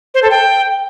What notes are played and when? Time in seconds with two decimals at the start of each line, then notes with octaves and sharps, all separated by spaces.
0.14 C5
0.23 A4
0.31 G5